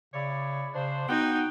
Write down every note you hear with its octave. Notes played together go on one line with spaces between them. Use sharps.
C#3 E4 C#5 D5
C#3 D4 C5
B3 D#4 F#4 G5